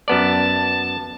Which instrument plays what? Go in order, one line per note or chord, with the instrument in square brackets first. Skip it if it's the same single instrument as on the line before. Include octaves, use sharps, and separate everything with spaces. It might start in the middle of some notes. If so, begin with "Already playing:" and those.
[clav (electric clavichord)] F#2 B3 D5 [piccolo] A5